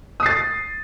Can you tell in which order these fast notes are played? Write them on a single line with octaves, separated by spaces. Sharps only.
D#6 C7 A6